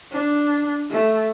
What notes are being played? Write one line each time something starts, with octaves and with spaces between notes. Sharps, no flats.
D4
A3